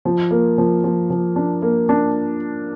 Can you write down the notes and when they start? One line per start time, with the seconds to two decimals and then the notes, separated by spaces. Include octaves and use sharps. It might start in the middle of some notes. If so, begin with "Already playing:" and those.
0.05 F3
0.31 A#3
0.58 F3
0.84 F3
1.10 F3
1.36 D4
1.62 A#3
1.89 D4